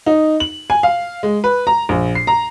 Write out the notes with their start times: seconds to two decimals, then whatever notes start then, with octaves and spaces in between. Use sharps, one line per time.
0.06 D#4
0.40 F#7
0.70 G#5
0.83 F5
1.23 G#3
1.44 B4
1.67 A#5
1.89 A#1
2.15 C7
2.27 A#5